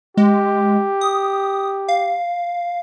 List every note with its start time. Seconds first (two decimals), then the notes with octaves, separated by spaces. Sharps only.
0.17 G#3 G4
1.01 D#6
1.88 F5